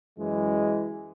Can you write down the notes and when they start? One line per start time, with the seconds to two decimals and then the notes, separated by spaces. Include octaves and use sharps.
0.18 F#2 E3 G#3